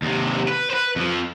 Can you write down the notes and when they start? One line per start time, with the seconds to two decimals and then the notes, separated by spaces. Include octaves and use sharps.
0.02 D#2 C3
0.48 B4
0.70 B4 C5
0.96 F2 F3